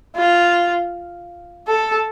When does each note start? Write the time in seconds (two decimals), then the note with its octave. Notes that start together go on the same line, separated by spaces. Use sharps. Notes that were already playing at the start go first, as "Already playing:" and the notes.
0.16 F4
1.67 A4